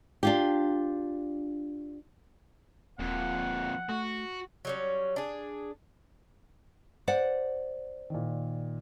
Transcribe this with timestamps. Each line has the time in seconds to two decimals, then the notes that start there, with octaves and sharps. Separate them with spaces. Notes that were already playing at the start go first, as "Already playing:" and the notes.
0.23 D4 F4 G4
2.99 D#1 F2 A#2 F#5
3.89 A3 F#4
4.65 F#3 G3 C#4
5.16 D4 G#4
7.07 C5 D5 F#5
8.10 A#2 D#3